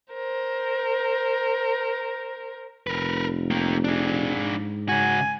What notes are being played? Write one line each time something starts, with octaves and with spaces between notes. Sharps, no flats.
A#4 C5
F1 A#4 B4
A#3 G4
D4 G#4
G#2
C#3 F#4 G#5